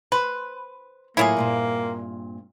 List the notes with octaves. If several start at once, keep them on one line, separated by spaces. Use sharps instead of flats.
B4 C5
A2 F#3 A#3 E4 F4 G#4
G2 A#2 C4